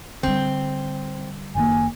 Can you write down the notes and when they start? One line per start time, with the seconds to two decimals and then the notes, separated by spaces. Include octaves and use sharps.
0.23 D3 G3 C4
1.55 F#1 D#3 A#3 G#5